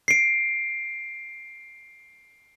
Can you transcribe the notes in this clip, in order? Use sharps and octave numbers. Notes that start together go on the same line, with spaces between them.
C7 D7